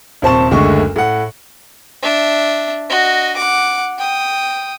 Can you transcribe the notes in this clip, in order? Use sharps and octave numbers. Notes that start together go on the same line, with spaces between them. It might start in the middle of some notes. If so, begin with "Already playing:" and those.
D#1 C3 C5 A5 C#6 E7
F#1 D2 D3 G#3 A3 C#6
A2 F#5
D4 E5
F#4 D#5
F#5 D6
G5 D#6